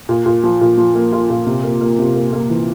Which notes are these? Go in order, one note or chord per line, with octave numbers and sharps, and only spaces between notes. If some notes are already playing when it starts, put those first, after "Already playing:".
A#2
A#2
F3
A#2
F3
A#3
F4
A#2
C3
A#3
A#3
C3
A#3
A#3
E3